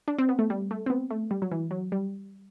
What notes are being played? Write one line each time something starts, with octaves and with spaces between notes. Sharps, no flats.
D4
C4
B3
A3
G3
A3
C4
B3
A3
G3
F#3
E3
F#3
G3